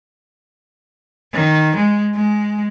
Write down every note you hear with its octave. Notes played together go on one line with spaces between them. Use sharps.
D#3
G#3
G#3